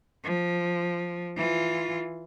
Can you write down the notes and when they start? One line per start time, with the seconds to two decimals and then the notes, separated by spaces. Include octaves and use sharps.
0.24 F3
1.37 E3 F4